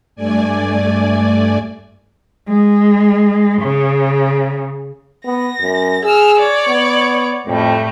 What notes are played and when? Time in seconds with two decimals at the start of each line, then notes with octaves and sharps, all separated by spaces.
0.15 G2 A3 D5 G#5
2.49 G#3
3.62 C#3
5.25 B3 A#6
5.61 F#2
6.03 G#4 E6 F6
6.38 C#5 D5
6.69 B3
7.47 F2 A2 G3 A3